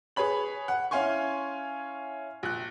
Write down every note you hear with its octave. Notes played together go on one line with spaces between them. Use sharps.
G#4 B4 C#5 B5 F#7
F#5
C#4 E4 F5 G#5 C6 C#6
A#1 F#6